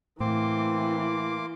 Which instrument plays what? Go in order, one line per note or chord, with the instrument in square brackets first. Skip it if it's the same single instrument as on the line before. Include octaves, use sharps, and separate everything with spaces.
[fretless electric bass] A2 [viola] E3 [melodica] A#3 C6 D6 [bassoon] C4